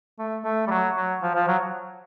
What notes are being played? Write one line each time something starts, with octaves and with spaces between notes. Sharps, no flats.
A3
A3
G3
F#3
F#3
F3
F3
F#3